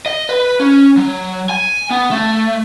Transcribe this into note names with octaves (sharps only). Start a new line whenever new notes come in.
D#5
B4
C#4
F#3
G#5
B3
A3